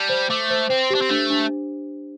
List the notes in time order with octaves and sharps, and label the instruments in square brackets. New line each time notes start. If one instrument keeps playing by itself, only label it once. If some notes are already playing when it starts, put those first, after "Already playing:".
Already playing: [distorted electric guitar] G3 [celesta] A5
[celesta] C5
[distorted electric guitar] A3 [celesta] D6
[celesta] C5
[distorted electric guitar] C4 [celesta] C5
[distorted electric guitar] D4 [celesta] G4
[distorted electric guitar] C4
[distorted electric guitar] A3 [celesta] D4
[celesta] D4